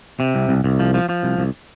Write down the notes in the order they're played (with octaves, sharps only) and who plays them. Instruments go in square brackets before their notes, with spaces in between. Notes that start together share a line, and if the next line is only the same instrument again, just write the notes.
[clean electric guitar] C3
C2
C2
C2
F3
F3
F3
C2
C2